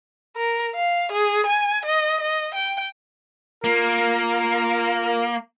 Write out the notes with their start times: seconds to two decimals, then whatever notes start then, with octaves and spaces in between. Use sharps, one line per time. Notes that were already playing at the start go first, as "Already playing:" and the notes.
0.36 A#4
0.75 F5
1.12 G#4
1.47 G#5
1.85 D#5
2.21 D#5
2.55 G5
3.64 A#3 F4 A#4